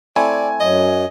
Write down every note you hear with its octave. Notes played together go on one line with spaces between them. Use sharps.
A3 C4 E4 D5 G#5
F#2 F#3 D#5